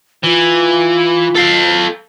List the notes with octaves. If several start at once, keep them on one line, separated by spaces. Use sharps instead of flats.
E3 F4
A4 F5